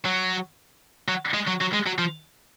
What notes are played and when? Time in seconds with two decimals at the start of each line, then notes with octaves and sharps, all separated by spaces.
0.05 F#3
1.08 F#3
1.34 G#3
1.47 F#3
1.61 F#3
1.73 G#3
1.86 F#3
1.98 F3